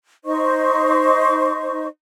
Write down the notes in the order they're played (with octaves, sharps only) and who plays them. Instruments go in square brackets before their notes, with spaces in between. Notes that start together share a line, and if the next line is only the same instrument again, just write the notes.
[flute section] D#4 C5 D#5 C#6